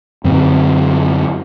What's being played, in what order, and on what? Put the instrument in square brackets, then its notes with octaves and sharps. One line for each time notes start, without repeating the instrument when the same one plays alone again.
[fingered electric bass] F#2 D3 C4